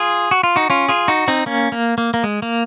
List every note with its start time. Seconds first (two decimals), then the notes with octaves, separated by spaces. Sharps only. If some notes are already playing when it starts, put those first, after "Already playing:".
Already playing: F4 G#4
0.31 F#4
0.43 F4
0.56 D#4 F#4
0.70 C#4 F4
0.88 F4 G#4
1.08 D#4 F#4
1.28 C4 D#4
1.46 A#3 C#4
1.72 A#3
1.98 A#3
2.14 A#3
2.23 G#3
2.42 A#3